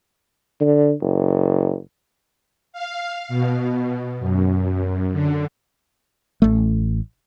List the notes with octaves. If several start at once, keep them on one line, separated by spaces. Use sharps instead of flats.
D3
F#1
F5
B2
F#2
D3
A1 A3